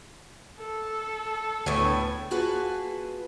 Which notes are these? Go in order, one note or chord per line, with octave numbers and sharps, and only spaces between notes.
A4
D2 A2 B3 G#5
A#3 F4 F#4 G#4 B4 A5